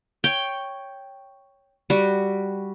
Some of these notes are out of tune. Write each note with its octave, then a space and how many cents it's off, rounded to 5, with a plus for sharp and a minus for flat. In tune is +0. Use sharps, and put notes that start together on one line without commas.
C#5 +0 G5 +0
G3 +0 F#4 +0